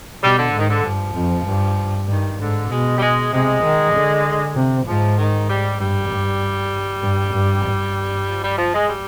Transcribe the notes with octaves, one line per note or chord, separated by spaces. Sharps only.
B2 G3
D3
G#2 D#3
D3
G2 F3
F2
G2
G2 D#3
G#2 D3
B2 G#3
G3
G#3
C3 G#3
D#3
D3
C3
G#2 F3
D#3
G3
G2 G3
G2
G2
G2
G2
F3
G3
F3
G#3
G3